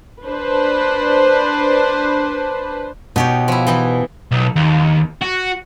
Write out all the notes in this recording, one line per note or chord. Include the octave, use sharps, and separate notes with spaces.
D4 B4 C5
B2 D#4 G4 C#5
F3 E4
E3 D#4 E4
B1
D#2
F#4